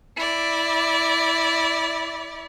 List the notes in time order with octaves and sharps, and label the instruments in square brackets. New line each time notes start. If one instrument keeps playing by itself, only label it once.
[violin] E4 D5